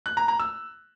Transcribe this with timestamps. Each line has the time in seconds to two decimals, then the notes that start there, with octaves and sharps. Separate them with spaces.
0.06 F#6
0.17 A#5
0.28 A#5
0.40 E6